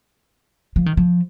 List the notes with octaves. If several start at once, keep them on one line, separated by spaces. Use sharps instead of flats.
F3
D#3
F3